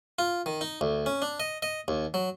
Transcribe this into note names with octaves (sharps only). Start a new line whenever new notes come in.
F4
D#3
D#4
D2
C#4
D4
D#5
D#5
D#2
F#3